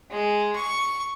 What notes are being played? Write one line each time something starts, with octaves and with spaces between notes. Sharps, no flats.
G#3
C#6